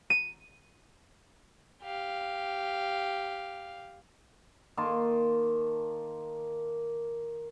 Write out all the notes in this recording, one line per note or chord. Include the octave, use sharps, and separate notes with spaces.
D#7
G4 F5
D#3 A#3 A5 C6